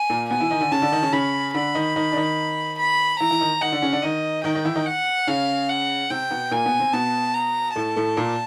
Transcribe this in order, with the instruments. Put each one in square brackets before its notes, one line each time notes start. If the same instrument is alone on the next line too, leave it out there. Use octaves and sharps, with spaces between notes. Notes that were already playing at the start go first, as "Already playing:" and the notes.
Already playing: [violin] G#5
[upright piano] A#2 A#3
[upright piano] B2 B3 [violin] G#5
[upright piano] E3 E4
D#3 D#4
D3 D4
[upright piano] C#3 C#4 [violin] A5
[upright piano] D3 D4
D#3 D#4
C#3 C#4
[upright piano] C#3 C#4 [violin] B5
[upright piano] D3 D4 [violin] B5
[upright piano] D#3 D#4
D#3 D#4
D4
D#3 D#4
[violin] B5
[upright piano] E3 E4 [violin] A#5
[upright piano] E3 E4
D#3 D#4
[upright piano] D#3 D#4 [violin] F#5
[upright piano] D3 D4
C#3 C#4
D3 D4
[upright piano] D#3 D#4 [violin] D#5
[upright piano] D#3 D#4 [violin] G5
[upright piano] D#3 D#4
E3 E4
D#3 D#4
[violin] F#5
[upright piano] C#3 C#4 [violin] F5
[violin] F#5
[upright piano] C3 C4 [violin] G5
[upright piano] B2 B3
[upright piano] A#2 A#3 [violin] G#5
[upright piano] B2 B3
C3 C4
[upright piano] B2 B3 [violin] A5
[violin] A#5
[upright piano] A2 A3 [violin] A5
[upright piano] A2 A3
A#2 A#3